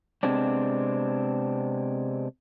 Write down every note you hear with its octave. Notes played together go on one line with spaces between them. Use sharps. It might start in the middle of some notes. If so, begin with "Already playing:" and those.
C3 G#3 B3 C4 D4